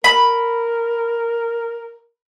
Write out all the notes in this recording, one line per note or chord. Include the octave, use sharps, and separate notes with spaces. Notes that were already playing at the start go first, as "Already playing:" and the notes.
A#4 B5